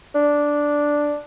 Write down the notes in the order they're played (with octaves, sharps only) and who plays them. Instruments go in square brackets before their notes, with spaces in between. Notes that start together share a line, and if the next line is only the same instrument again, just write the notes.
[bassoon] D4